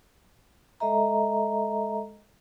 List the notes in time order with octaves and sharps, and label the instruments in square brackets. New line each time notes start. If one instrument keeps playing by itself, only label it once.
[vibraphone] G#3 A4 D#5 E5 A#5